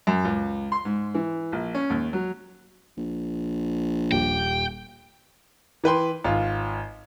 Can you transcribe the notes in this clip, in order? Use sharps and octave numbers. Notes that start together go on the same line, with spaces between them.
F#2
C#2
C6
G#2
E3
A#1
C#4
D#2
F#3
A#1
D#1 G4 G5
E3 B4 G5 C6
G#1 F4